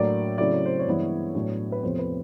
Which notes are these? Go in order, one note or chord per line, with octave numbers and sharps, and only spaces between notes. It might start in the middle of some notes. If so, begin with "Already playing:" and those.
Already playing: A2 F#3 A#3 D4 D5
C#3 F#3 A3 C4 E4 D5
C#5
C5
C#5
G2 E3 G#3 B3 E4
A2 F#3 B3 D4
B4
E2 C3 F3 A3 C4 C5
B4